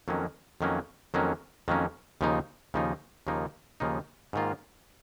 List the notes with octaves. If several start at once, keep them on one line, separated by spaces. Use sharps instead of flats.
F2 D#3 F#3 A#3 C#4
F2 D#3 F#3 A#3 C#4
F2 D#3 F#3 A#3 C#4
F2 D#3 F#3 A#3 C#4
D#2 C#3 F3 A#3 D#4
D#2 C#3 F3 A#3 D#4
D#2 C#3 F3 A#3 D#4
D#2 C#3 F3 A#3 D#4
G#2 D#3 A#3 F4